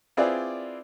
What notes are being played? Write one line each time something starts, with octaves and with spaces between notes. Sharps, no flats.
C4 E4 F4 G#4 B4 D5